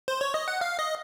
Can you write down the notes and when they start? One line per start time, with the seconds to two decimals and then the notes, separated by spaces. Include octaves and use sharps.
0.08 C5
0.21 C#5
0.34 D#5
0.48 F#5
0.61 F5
0.79 D#5